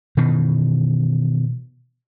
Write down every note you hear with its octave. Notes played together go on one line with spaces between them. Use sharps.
B2 D#3 E3